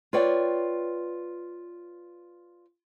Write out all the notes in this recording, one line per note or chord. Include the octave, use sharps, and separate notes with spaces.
F4 B4 C#5 D5 G5